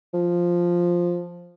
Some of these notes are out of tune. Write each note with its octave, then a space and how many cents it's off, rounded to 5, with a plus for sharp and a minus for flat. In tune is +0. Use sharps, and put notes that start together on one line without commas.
F3 +0